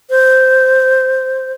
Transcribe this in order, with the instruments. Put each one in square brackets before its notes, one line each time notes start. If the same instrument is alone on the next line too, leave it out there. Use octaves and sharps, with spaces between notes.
[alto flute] C5